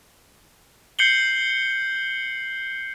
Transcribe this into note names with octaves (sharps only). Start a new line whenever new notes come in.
G6 C7 C#7 F#7 G7